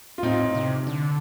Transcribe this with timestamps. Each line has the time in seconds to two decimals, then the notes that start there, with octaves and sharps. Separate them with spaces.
0.18 F4
0.23 A2 C4 D#4
0.55 C3
0.87 D3